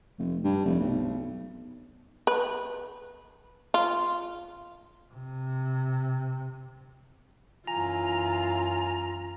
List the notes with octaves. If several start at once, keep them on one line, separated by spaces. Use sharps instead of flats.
F1
G2
F1
B1
B4
F4
C3
F#2 E3 F4 G#5 A#5